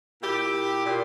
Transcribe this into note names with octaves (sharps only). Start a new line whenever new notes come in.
A#2 E4 G4
A#2
A#2